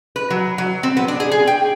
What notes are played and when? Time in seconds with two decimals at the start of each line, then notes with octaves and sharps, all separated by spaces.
0.16 B4
0.30 F#3
0.58 F#3
0.83 C4
0.97 B3
1.08 D4
1.20 G#4
1.32 G#4
1.47 G5